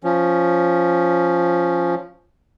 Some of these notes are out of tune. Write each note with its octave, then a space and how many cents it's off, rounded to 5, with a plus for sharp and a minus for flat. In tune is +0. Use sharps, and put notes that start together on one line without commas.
F3 +0 C#4 +0